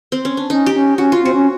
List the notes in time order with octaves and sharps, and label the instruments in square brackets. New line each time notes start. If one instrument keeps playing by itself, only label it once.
[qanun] C4
C#4
D4
[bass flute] C#4 [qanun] D#4
[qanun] G4
[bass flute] C#4
[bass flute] C#4 [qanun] F#4
[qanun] F4
[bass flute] C4 [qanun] F#4
[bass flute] C#4